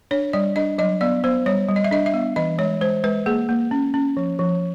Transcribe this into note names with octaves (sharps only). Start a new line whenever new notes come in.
D4 C#5
G3 D5
D4 D#5
F#3 D#5
B3 D5
B3 C5
G3 C#5
G3
D#5
E5
D4 D#5
E5
B3
E3 D#5
G#3 C#5
G#3 C5
G#3 B4
A#3 G#4
A#3
C#4
C#4
F3
F3